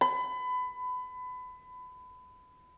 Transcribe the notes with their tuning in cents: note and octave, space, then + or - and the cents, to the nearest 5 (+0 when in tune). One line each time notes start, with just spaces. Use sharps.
B5 +25